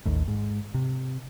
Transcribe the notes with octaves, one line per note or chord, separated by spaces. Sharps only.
A1 D#2 A2
G#2
C3